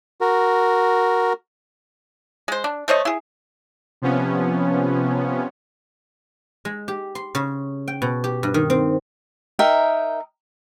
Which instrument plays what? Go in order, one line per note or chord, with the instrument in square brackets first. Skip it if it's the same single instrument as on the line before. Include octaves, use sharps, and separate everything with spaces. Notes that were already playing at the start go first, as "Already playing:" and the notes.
[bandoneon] F#4 A#4
[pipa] G#3 C5
D4
A3 C5 C#5 D#5
E4 G#4
[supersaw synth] C3 F3 B3 C#4
[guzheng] G#3
G4
C6
C#3
G5
B2
G4
G2
D#3
C4
[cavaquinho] D#4 A#4 E5 G5